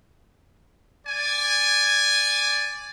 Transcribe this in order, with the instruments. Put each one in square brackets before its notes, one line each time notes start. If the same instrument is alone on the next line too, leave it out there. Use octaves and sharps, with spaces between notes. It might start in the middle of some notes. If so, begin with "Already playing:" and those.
[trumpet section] D5 G#5